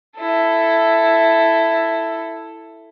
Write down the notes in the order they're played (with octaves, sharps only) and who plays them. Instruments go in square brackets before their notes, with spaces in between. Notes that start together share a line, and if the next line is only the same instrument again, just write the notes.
[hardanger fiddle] E4 A4